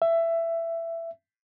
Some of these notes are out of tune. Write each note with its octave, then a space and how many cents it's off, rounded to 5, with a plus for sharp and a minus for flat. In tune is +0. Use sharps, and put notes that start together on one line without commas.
E5 +15